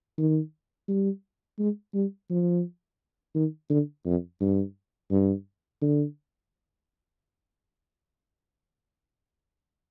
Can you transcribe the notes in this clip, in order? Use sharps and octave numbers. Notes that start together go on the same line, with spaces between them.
D#3
G3
G#3
G3
F3
D#3
D3
F2
G2
G2
D3